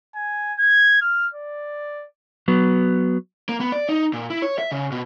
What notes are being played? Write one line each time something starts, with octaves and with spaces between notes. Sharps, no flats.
G#5
G#6
F6
D5
F#3 B3
A#3
B3
D5
D#4
A#2
E4
C#5
E5
C#3
B2